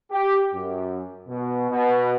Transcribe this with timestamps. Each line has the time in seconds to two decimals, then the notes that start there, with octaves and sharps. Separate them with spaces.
0.11 G4
0.54 F#2
1.28 B2
1.71 B2